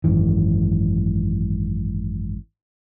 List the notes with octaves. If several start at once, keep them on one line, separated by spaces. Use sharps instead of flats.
G#1 F#2 E3